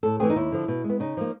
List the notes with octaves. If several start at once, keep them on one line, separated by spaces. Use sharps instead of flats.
A2 A4
E3 A3 C4 G#4
D#4
D#2 E4
D3 F3
B2
G#3
B3
C#3 D#4
F3 A#3